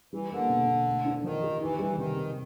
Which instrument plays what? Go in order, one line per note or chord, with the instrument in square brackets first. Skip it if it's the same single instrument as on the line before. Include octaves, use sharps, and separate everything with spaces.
[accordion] E3 [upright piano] G3
[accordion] D3 [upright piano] A#3
[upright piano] B2
B2
A3
D4
[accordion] D#3 [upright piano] F3
[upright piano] G4
[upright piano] D#3 [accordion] E3
[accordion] E3 [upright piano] G3
[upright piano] C3 [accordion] D#3
[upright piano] C3